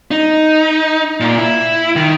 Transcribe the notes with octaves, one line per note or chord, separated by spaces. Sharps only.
D#4
A#2
E4
D#3